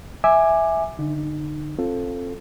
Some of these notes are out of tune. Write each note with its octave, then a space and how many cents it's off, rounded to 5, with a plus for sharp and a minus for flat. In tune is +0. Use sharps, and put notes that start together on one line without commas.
E5 -10 G#5 -5 D6 +15
D3 -5 D#4 -30
C4 +25 F4 +0 A4 +0